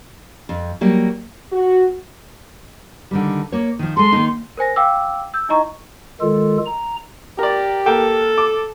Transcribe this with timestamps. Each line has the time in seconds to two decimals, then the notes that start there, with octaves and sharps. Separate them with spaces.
0.49 F2
0.81 F#3 G3 A#3
1.52 F#4
3.11 D3 D#3 G3
3.52 A#3 C#5
3.79 D#3 F3
3.97 G#3 A4 C6
4.12 D#3 A#3 D#4
4.57 A#4 C5 G#5 A#6
4.76 F5 G5 D6 E6
5.34 E6 G6
5.49 D#4 E4 D#5 A#5 C#6
6.21 D#3 G#3 F4 A4
6.66 A#5
7.39 G4 A#4 D5
7.86 A#3 A4 G5
8.38 D6